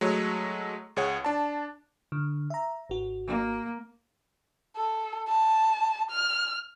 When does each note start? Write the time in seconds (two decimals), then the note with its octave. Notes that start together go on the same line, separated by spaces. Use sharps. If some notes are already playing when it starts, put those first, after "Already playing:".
0.01 F#3 G#3 A3 C#5
0.96 C#2 G#4 C#5 F#5
1.25 D4 A5
2.12 D3
2.50 E5 A#5
2.90 G#1 F#4
3.26 A#3
4.76 A4
5.29 A5
6.11 F6